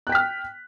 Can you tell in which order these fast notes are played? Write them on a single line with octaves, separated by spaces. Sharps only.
F#6 G5 B6 F6